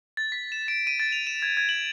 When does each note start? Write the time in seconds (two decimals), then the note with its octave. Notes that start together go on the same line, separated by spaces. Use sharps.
0.17 A6
0.32 B6
0.52 E7
0.68 D7
0.87 D#7
1.00 A6
1.12 F7
1.27 E7
1.42 G#6
1.57 G#6
1.69 F#7